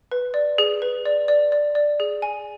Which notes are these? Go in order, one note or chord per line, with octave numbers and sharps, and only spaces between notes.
B4
D5
G#4
B4
D5
D5
D5
D5
G#4
G#5